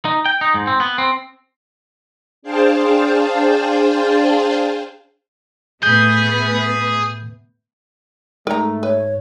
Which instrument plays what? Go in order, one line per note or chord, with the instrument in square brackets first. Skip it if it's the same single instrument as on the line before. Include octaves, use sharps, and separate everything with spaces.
[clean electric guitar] D#4
G5
D#4
G#2
C4
B3
C4
[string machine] D4 G#4 C5 F5 G5 A5
[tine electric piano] A2 G6 [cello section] A3 B3 B4 [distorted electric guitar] G#4
[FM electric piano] G#2 [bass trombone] A3 [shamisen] A#4 A#5
[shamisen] B4 [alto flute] C#5